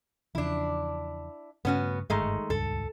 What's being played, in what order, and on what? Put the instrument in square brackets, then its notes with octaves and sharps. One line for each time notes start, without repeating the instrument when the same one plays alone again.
[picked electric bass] E2 C#3 F3 [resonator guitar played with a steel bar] D4 E4
[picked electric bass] G2 C#3 A3 [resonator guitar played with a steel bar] B3 C#4 F#4
[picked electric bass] G1 G#2 [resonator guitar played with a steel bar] D#3 G#3 A3
[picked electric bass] D#1 C#2 G2 [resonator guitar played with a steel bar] A4